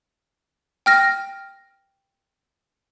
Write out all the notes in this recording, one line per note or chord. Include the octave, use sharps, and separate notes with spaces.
G5 F6 A#6